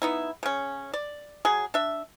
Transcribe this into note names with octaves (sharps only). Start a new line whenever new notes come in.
B3 D#4 E4
C#3 C#4
D5
F#3 G#4
D4 E5